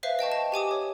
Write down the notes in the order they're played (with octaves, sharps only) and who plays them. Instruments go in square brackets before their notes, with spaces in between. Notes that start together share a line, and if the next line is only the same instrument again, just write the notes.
[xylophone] B4 C5 E5 F5 C7
D#5 G5 A5 C#6
A5
G4 G#5 D6 D#6
C#5